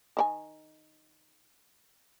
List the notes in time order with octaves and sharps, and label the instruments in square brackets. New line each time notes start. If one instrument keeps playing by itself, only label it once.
[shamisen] D#3 E4 G#5